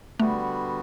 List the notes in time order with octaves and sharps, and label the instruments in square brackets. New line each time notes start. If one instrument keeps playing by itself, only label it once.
[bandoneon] D3 G3 B3 F#4 [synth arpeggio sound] A3